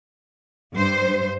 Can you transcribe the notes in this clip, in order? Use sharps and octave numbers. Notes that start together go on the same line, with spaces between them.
G2 C5